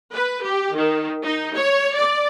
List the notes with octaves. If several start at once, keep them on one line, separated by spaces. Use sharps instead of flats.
B4
G4
D#3
D#4
C#5
D5